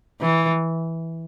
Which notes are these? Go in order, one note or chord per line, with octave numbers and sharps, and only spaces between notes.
E3